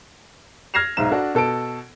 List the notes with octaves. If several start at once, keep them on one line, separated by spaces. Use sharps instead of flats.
F6 G#6 A#6 C7 E7 F7
B1 G#2 E5 A#5 E7
D4 F#4 A4
B2 A4 A5 D7